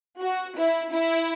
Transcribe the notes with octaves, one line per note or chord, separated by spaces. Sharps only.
F#4
E4
E4